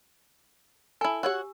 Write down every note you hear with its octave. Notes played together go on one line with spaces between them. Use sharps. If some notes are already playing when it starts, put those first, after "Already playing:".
E4 A4 G#5
F#4 G4 C#5 F#5 E6